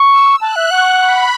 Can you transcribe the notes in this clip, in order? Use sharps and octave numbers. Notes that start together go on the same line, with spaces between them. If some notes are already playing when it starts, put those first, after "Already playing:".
Already playing: C#6
E6
A5 F#6
E5
F#5 C#6
B5